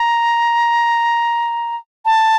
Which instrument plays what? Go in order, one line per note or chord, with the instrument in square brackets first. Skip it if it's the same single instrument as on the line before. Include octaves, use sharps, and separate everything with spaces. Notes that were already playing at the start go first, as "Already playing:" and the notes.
Already playing: [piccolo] A#5
A5